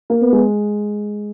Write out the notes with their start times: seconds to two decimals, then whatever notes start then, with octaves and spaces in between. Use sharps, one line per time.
0.10 A#3
0.22 B3
0.32 G#3